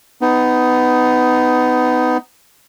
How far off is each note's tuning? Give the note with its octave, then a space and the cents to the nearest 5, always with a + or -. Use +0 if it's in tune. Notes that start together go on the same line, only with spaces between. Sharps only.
B3 +20 D#4 +0